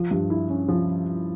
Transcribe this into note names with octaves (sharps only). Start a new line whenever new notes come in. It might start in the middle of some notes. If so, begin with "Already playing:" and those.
Already playing: F3
G2
E4
C#4
F3